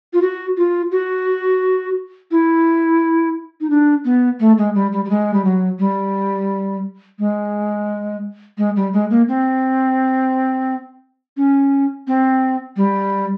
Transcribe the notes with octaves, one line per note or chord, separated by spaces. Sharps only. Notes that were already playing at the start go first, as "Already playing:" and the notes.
F4
F#4
F4
F#4
E4
D#4
D4
B3
A3
G#3
G3
G3
G3
G#3
G3
F#3
G3
G#3
G#3
G3
G#3
A#3
C4
C#4
C4
G3